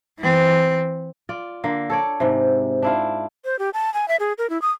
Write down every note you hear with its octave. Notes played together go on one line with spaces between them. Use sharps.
E3 C4
F4 D5
D3 A#3
A4 C#5 D5
G#2 C3
D4 E4 F4
C5
G4
A5
G#5
E5
G#4
A#4
E4
D#6